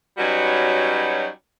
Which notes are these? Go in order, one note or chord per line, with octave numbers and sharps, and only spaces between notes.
F#3 G3 C#4 D#4 F#4 B4